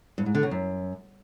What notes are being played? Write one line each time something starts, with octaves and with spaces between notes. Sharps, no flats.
G2
G#2
D3
C#3
F#2